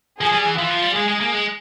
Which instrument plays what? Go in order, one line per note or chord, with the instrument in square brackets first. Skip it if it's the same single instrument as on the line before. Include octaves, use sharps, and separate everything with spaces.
[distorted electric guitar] F3 [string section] G#4
[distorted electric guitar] G3
E3
[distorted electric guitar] E3 [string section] F4
[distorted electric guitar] F3
G3
[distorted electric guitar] G#3 [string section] G#4
[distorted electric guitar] G#3
A#3
G#3